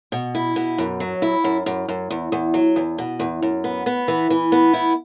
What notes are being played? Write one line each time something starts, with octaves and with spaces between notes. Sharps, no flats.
B2
E4
B2
F#2
F#3
E4
F#2
F#2
F#2
E2
E2
F#3
E2
B2
E2
F#2
B3
B3
E3
E3
B3
E4